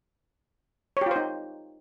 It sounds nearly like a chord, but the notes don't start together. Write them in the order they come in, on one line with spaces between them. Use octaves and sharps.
C#5 G4 F4 C5 D#4